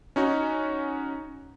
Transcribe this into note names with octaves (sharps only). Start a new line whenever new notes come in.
C#4 D#4 F#4